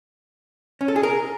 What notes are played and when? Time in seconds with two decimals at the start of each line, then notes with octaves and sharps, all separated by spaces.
0.81 C#4
0.88 A4
0.96 G#4
1.03 A#4